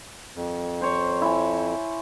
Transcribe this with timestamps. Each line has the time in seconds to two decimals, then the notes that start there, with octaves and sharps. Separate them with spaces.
0.35 F2
0.81 C5 C#5
1.22 E4 G#5